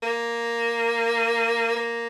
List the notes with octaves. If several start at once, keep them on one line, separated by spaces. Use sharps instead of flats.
A#3
A#3